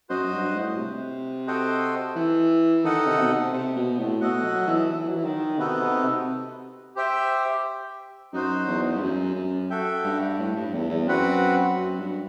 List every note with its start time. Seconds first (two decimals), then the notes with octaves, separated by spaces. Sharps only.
0.09 F#2 F#4 C5 D#5
0.23 F#2
0.33 G2
0.55 A2
0.78 C3
1.47 F#4 A4 C5 D#5 G5
2.16 E3
2.84 D#3 D#4 A4 D#5 F#5
3.07 C3
3.19 B2
3.30 C3
3.53 C3
3.76 B2
3.99 A2
4.21 B2 F#4 A4 D#5 F#5
4.44 F#3
4.67 E3
4.90 E3
5.07 F#3
5.16 E3
5.24 D#3
5.58 C3 B3 D#4 F#4 A4
5.81 C3
6.04 C3
6.96 G4 C5 E5 G5
8.33 F#2 D#4 F#4 C5
8.67 E2
8.95 G2
9.01 F#2
9.35 F#2
9.70 F#4 A4 E5 G5
10.04 G2
10.39 A2
10.56 G2
10.73 E2
10.90 E2
11.07 F#2 C4 F#4 B4 F#5
11.76 F#2
11.99 G2